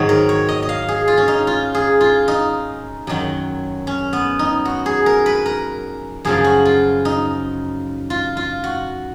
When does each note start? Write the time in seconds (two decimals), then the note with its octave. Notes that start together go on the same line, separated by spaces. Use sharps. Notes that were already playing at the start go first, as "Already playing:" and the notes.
Already playing: G#2 D#3 F#3 C#5 D#5
0.09 A#4
0.29 C#5
0.49 D#5
0.62 D#5
0.69 F5
0.88 G#4
1.08 F4
1.17 C#4
1.28 D#4
1.47 F4
1.75 G#4
2.01 F4
2.28 D#4
3.07 F#2 D#3 F#3
3.87 C#4
4.13 B3
4.39 D#4
4.65 F#4
4.86 G#4
5.06 A#4
5.26 B4
5.46 A#4
6.25 F#2 C#3 F3 G#4
6.44 F#4
6.65 F4
7.05 D#4
8.10 F4
8.37 F4
8.64 F#4